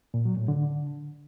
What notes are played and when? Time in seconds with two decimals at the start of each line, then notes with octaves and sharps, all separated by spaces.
0.14 A#2
0.25 F#3
0.37 A2
0.48 D3